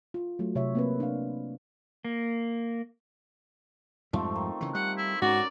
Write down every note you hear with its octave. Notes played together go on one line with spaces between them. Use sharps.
F4
F#3 A3
C3 C#5 E5
A#3 C4 B4
D4 F5
A#3
F2 G#2 F3 G3 A3 C4
D#3
C#3 E3
G3 F#5
E4
G#2 C#4 F#4 A#4 D5